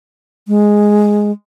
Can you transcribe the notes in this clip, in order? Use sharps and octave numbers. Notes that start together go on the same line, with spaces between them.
G#3